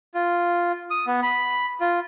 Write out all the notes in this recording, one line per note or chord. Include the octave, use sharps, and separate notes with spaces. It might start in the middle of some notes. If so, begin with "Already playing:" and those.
F4
D#6
B3
B5
F4